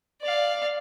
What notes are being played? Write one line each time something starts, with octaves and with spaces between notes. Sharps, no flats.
D5 F5